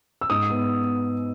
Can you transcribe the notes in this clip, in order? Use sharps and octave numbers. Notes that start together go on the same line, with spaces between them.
E6
G#2 D#6
B3